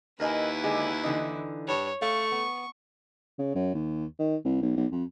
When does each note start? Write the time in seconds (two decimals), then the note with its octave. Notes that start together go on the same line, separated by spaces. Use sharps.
0.20 D#2 E4 A#4 B4 D#5 G#5
0.64 D3 G#3 G#5
1.04 D3 E3 D#4
1.68 G2 C#5
2.02 A3 F5 C#6
2.32 B3
3.38 C#3
3.55 F#2
3.74 D#2
4.19 D#3
4.45 C2
4.62 B1
4.76 B1
4.91 F2